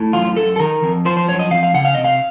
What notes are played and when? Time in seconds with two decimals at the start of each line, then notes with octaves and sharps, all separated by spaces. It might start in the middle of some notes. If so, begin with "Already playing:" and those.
Already playing: A2
0.13 F#2 F4
0.37 F#2 A4
0.56 A4
0.59 D#3 A#4
0.83 F2
1.05 F3 C5
1.17 C5
1.28 F#2 C#5
1.39 D#5
1.50 F2 F5
1.63 F5
1.74 C#3 F#5
1.85 F5
1.95 C3 D#5
2.04 F5